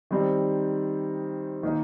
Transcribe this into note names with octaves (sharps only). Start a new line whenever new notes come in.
D#3 G3 C4 D#4
D#3 A#3 D#4